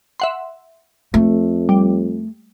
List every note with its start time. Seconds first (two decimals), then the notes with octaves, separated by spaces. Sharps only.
0.20 E5 F#5 C6
1.14 F2 A3
1.69 G3